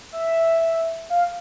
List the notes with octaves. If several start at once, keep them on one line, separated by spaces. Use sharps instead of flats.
E5
F5